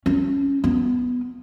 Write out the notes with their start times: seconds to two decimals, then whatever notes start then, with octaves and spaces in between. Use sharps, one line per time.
0.06 C#4
0.64 B3